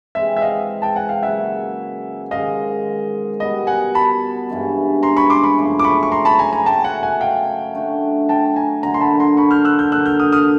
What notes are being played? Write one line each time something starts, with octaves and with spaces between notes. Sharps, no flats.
E3 G#3 C4 E5
E5
D#5 F5
G5 A5
F#5 G#5
F5 G5
C#3 F#3 A#3 E5 F#5
G#2 D#3 G#3 C#4 D#5 F5
B2 G3 B3 D#5
F#5 G#5
A5 B5
G2 E3 G#3 C#4
A#5 C6
B5 C#6
C6 D6
B5 C#6
F#2 C#3 F3 A3
D6
B5 C#6
C#6
A#5 C6
A5 B5
G#5 A#5
G#5 A#5
F#3 A3 C#4 G5 A5
F#5 G#5
F#5 G#5
F5 G5
A3 D4 F#4
G5 A5
G#5 A#5
D3 F#3 A#3 D4 G#5 A#5
C6
A5 B5
A#5 C6
B5 C#6
F6 G6
E6 F#6
F6 G6
D3 F#3 A#3 E6 F#6
F6 G6
D#6 F6
D#6 F6